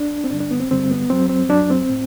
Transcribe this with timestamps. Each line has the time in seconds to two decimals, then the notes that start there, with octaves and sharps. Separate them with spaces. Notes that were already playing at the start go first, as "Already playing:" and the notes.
Already playing: D4
0.24 C4
0.30 G2 D3 G3 D4
0.40 D4
0.51 B3
0.60 C4
0.71 G2 D3 G3 C4
0.91 B3
1.10 F#2 F#3 C4
1.29 C4
1.49 F#2 F#3 D4
1.70 C4
1.89 A2